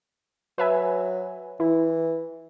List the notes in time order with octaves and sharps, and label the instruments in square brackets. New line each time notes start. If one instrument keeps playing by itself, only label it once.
[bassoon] F#3 [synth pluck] B4 E5 G#5
[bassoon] E3 [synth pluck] E4